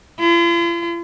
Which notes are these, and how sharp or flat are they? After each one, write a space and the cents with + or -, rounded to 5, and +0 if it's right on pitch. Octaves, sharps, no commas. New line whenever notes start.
F4 -45